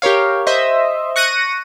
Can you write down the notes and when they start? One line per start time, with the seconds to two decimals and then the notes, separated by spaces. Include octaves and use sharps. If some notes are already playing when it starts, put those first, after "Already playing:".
0.02 G4 A#4 C#5 F5
0.47 C5 D#5 E5
1.16 C#6 F#6 A#6 C#7 D#7